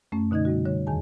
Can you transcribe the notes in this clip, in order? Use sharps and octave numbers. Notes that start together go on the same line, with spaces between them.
F#2 A3 C#4
B2 D3 D#4 D#5 G#6
C3 G3 F#4
D3 G3 C#5
E2 D#3 G#4 G#5 A5